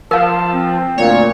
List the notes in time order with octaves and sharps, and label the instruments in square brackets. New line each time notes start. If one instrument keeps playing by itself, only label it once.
[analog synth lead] F3 [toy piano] A#4 F5 [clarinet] A5
[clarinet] C4
[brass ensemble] D2 A#2 [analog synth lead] C#5